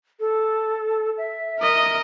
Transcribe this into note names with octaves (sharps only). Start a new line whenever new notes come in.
A4
E5
A#4 D#5